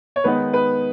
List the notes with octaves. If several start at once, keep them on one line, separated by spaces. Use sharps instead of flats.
C#5
D#3 G#3 B3 D#4 B4
B4